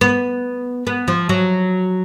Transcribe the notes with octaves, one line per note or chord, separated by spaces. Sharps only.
B3
B3
F3
F#3